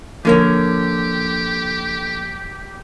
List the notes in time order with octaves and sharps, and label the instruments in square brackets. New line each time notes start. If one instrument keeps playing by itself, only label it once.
[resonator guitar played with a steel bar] D3 A#4 C#5 [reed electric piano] F3 A#3 G#6 [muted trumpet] G4